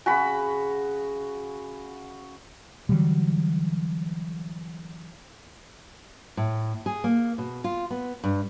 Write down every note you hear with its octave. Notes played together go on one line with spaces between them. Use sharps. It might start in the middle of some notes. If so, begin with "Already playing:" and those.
C#3 F#4 G#4 G#5 B5
D3 E3 F#3 G3
A2
G#4
A#3
B2
F4
B3
G2